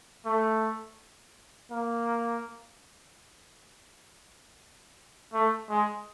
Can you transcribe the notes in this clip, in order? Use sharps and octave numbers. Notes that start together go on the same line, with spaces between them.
A3
A#3
A3
G#3